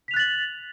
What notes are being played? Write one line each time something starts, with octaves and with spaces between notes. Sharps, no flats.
F#6 A6 B6 F7 F#7